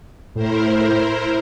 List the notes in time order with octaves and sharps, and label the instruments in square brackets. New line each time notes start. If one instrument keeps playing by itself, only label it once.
[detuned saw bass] A2 [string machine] E4 A#4 C5